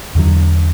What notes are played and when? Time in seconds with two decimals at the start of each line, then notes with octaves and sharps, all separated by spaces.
0.15 E2 D3 F#3